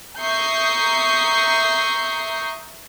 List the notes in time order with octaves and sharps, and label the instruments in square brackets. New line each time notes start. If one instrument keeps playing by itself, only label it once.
[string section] E5 A#5 C#6 D#6 G6 C7